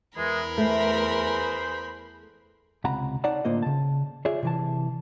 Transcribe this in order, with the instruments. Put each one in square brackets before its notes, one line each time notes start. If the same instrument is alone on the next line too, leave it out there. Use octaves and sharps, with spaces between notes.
[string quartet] E2 A#4 B5 [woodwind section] E3 G#3
[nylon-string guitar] A3 [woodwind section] G#4 B4 C5
[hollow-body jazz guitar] C#2 C3 F#5 A#5 B5
D#4 C#5 D5 F#5 A5 A#5
A2 D3 A#3 F4 C5 D#5
C#3 A5
F4 G#4 C#5 D5 E5
C3 E3 A5